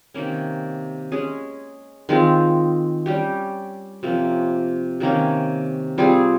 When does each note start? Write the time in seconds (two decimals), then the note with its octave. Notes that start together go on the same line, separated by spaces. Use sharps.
0.14 C3 D#3 A#3 C#4
1.12 G#3 C#4 G#4
2.09 D#3 G#3 C4 F4
3.06 G3 C#4 G4
4.03 C3 F3 A#3 C#4
5.00 C3 D#3 A#3 C#4
5.98 G3 C4 F4 G#4